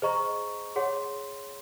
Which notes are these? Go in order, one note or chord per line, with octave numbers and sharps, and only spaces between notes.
G#4 C5 D#5 A#5 C#6
G#4 C#5 F#5 C6